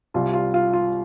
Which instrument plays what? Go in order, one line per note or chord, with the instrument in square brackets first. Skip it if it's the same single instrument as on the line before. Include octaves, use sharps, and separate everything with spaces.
[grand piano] C2 C3 G3 F4
F4
F4
F4